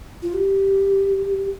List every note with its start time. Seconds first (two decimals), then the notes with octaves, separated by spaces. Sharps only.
0.22 F4
0.34 G4